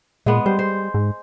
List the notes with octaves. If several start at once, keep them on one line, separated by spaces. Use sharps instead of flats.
A#2 G#3 B3
G3 C5
C5
G#2